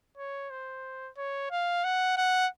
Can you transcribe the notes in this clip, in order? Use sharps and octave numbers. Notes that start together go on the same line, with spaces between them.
C#5
C5
C#5
F5
F#5
F#5